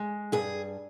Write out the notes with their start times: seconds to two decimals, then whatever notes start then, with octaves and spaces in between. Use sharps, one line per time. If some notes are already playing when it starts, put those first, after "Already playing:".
Already playing: G#3
0.32 G2 G#4